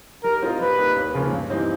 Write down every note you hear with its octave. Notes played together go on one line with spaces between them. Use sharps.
G3 A#4
C4 F4 A#4 D#5
G3 B4
A#3 D#4 G4
D#2
C#3 F3 A#3 C#4
G2
E3 G3 C4 D#4